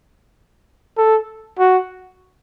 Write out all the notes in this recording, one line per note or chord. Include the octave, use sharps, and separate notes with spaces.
A4
F#4